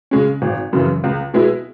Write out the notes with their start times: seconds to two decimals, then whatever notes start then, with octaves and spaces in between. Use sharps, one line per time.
0.11 C#3 G#3 C#4
0.42 G#1
0.73 F#2 C#3 E3
1.04 C#2
1.34 B2 G#3 B3 E4